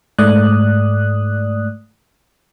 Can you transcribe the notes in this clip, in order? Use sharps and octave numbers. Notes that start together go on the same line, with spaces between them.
G#2 A3 D5 D#6 F#6